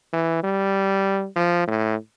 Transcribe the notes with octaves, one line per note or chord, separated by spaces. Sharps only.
E3
G3
F3
A2